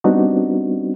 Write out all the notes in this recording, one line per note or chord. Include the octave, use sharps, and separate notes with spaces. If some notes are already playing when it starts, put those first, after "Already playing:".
G3 B3 C4 D4 D#4 F#4